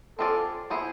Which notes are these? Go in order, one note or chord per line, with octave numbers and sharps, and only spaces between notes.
C4 F4 G#4 A4 B4 D5
B3 E4 G#4 C5